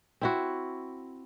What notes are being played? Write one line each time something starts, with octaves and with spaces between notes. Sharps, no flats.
C4 E4 F#4